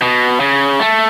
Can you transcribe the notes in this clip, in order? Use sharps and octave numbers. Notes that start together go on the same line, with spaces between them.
B2
C#3
A3